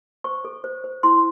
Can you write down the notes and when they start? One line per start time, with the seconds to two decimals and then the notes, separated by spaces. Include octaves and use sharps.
0.24 C5 C#6
0.45 A4
0.64 C5
0.84 C5
1.03 E4 C6